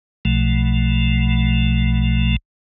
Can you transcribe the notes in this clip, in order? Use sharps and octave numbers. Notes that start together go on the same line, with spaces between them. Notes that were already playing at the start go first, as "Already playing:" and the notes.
B1 B2 F3 A3